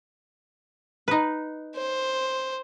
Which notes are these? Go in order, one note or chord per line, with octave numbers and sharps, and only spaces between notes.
D#4 B4
C5